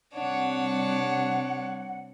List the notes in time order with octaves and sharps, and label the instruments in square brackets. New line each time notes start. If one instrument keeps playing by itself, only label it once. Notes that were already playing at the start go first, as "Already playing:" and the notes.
[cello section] C3 G3 C4 [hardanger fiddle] D4 C#5 [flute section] F#5